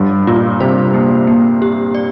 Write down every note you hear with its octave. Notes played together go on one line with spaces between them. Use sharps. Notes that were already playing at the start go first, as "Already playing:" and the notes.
Already playing: G2 G3
A#2 F4
C3 C5
A#3
A#3
G4
D5